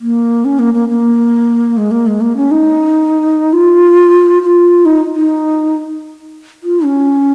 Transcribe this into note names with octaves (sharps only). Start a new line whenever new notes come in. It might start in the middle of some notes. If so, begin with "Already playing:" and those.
A#3
C#4
A#3
A#3
A#3
G#3
A#3
G#3
A#3
C#4
D#4
F4
F4
D#4
D#4
F4
C#4